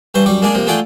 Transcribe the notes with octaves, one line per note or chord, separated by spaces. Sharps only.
G2 E3 C5 C#6
F#2 G3 C#6 D6
G#3 A#3 D4 G#4 D5
C3 F3 A#3
A3 F4 G#4 D5 F#5 G5